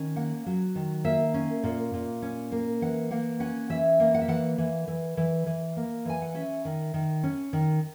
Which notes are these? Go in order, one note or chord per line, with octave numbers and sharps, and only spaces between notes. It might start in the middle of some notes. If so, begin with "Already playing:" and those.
Already playing: D#3 C#4
A#3 F#5
F#3
D#3
A#3 E5
C#4
A#2
A#2
C#4
A#3
E3 F#5
A#3 F#5
C#4 F#5
E3 E5
A#3
F#5
E5
E3 F#5
E3
E3
E3
E3
A#3
E3 G#5
F#5
C#4 E5
D#3
D#3
C#4
D#3